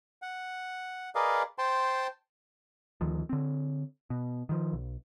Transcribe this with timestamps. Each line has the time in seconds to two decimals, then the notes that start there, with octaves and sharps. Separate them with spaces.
0.22 F#5
1.15 G#4 A#4 B4 D5 D#5 F5
1.58 C5 G5 A5 C6
3.01 D2 D#3 F3
3.29 D3 C4
4.10 B2
4.49 D#3 F3
4.73 B1